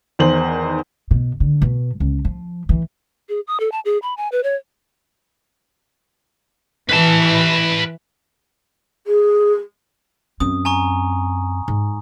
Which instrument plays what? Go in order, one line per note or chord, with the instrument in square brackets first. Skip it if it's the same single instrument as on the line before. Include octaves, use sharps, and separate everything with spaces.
[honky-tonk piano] E2 D#3 C5 F#7
[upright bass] B2
D3
B2
C#2
F3
E3
[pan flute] G#4
D#6
A4
A5
G#4
B5
G#5
B4
C#5
[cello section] E3 [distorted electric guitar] B4 A5
[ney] G#4
[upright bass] F#2 C4 [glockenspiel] D#6
[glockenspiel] G#5 A#5 C#6
[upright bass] G#2